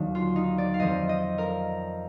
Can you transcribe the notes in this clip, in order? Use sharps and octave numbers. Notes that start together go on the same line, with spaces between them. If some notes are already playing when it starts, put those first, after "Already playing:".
Already playing: D#2 D3 F#3
F4
D#4
D5
F5
F2 F3 D#5
D#5
A#4